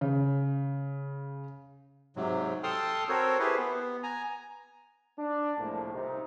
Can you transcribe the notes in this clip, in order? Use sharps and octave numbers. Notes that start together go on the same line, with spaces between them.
C#3
G#2 C3 F#3
A4 G5 A5 C6 D#6 F6
C4 F#4 A4 A#4 C5 C#5
E4 G4 G#4 B4 C5
B3
G#5 A#5
D4
C2 A2 F3 G#3 A#3
C3 D#4